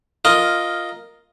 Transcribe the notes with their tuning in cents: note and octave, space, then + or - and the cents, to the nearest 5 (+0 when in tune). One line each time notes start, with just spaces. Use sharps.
F4 +0 A#4 +0 D#5 +0